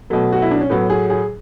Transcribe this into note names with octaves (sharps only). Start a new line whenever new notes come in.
B2 F#3 A3
F#4
E4
D4
C#4
A2 F#3 B3
G#4
G#4